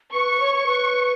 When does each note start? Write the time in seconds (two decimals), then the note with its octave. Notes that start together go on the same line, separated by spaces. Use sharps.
0.13 B4 C#6
0.40 C#5
0.66 B4